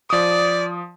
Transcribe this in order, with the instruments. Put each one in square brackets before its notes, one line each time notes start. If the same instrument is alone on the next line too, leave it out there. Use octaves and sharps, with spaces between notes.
[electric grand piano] F3 D#6 [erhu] D5